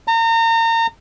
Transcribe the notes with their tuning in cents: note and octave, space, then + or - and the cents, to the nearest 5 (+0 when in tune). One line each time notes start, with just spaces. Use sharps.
A#5 -35